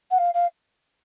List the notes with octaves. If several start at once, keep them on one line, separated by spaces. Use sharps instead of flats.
F#5
F5
F5